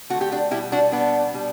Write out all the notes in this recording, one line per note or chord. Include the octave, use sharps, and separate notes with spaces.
D3 A3 F#4
G4
D4 F#4
B2 G3 E4 G4
D4 F#4
B2 G3 B3 D4
B2 G3